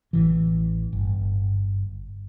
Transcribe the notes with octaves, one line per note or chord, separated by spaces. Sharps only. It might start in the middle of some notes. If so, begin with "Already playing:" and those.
A1 E3
G1